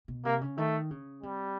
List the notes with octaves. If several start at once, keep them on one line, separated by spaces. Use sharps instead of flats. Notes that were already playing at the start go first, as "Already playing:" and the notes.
B2
C3 A#3
C#3
D#3 A3
C#3
C3 G3